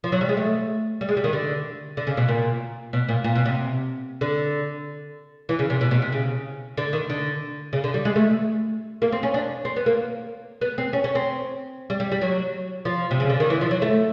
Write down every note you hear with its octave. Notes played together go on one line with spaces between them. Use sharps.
F3
F#3
G3
G#3
A3
G3
G#3
G3
D#3
D3
D3
C#3
B2
A#2
B2
A#2
A#2
B2
C3
D3
E3
C#3
C3
B2
B2
C3
C#3
D3
D#3
D3
C#3
D3
G3
G#3
A3
A#3
C4
C#4
D4
C4
B3
A#3
B3
C4
C#4
C#4
C4
G3
G3
G3
F#3
F3
C3
C#3
D3
D#3
E3
F3
F#3
A3